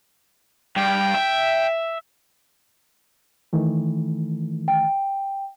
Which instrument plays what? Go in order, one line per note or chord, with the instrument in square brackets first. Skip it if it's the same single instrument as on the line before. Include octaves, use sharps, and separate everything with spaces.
[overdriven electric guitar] G2 [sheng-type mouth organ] G5
[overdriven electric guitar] E5
[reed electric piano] D#3 E3 A3
[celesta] G5